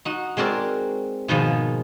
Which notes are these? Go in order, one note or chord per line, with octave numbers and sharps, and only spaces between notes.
D#4 F#4
G#3 C4 F#4 A#4 D5
G#2 B2 D#3 F3 G#3